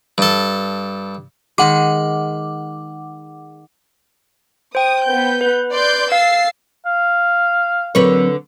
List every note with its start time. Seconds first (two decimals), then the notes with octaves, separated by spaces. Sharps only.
0.18 G2 A4
1.58 D#3 G#3 F#5 D6
4.75 C5 G5 D#6
5.06 B3 G6
5.41 B4
5.73 D5 C6 G6
6.12 F5 E6 A6 C7
6.86 F5
7.95 D3 F#3 C4 A#4 B4 C#5